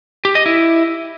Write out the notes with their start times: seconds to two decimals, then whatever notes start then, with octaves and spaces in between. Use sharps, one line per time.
0.25 G4
0.35 D#5
0.46 E4